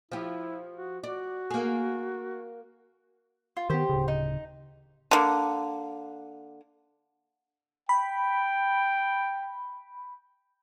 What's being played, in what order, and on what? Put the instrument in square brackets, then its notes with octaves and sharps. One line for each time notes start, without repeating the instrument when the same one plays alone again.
[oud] F3 G4 [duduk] E4
[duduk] F#4
[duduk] F#4 [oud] D5
[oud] A#3 G#4
[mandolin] F4
[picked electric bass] D#3 B3 [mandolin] G4 C5
[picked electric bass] D1 C#3
[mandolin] D#4
[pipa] D3 A#3
[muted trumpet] G5 [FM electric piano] B5